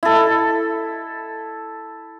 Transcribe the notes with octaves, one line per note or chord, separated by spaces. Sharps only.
E4 A4